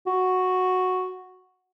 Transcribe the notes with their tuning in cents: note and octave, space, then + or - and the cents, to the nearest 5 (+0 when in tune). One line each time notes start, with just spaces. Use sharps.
F#4 -5